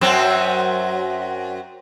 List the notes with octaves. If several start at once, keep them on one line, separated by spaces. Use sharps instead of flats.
F#2 F#3 C4